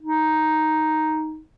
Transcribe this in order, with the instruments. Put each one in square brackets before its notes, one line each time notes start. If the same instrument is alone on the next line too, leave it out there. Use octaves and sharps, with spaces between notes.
[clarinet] D#4